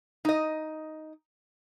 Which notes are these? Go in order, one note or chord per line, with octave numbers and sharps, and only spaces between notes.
D#4 D#5